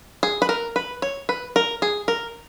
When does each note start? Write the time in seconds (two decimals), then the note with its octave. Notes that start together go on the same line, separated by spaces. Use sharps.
0.23 G#4
0.42 B4
0.49 A#4
0.76 B4
1.02 C#5
1.29 B4
1.56 A#4
1.82 G#4
2.08 A#4